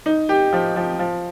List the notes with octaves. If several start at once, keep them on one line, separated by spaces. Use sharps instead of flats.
D#4
G4
F3
F3
F3